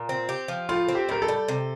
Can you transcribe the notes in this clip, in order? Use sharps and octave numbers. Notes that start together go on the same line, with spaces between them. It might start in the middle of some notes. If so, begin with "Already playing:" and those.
Already playing: A#2
C4
G4
F3
A2 F4
C4
G4
A2 A#4
A4
G3
C3